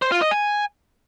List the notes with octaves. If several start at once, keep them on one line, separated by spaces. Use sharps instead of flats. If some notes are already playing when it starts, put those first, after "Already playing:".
C5
F4
D#5
G#5